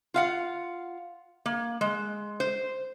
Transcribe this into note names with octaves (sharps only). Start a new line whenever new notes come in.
F4 F5 F#5
A#3
G#3
C5